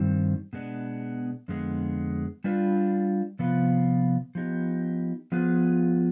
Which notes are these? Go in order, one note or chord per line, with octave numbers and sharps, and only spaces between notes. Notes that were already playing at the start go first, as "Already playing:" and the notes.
Already playing: G2 D#3 G3 C4
B2 G#3 B3 D4
F2 D3 G#3 B3
G3 D4 F4 B4
C3 F3 B3 F4 B4
F3 B3 D#4 G4
F3 B3 F4 G#4 B4